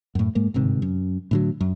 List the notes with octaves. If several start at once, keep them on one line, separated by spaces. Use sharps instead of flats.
F#2 A2
G#2 G#3 A#3
G1 G#2 C3 D#3
F#2
A2 D3 F#3
F#2